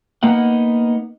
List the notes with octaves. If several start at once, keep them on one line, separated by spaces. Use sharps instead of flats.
A#3 B3 D#4 F#5